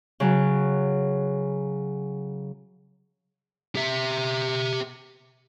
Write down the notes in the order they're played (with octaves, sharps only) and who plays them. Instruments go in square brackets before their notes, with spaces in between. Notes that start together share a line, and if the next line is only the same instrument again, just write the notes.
[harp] C#3 F#3
[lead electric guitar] G4 E5